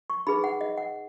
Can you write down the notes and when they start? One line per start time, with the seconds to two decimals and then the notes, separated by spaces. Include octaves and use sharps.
0.10 C#6
0.27 D#4 G#4 B4 B5
0.44 F#5
0.61 D#5
0.77 F#5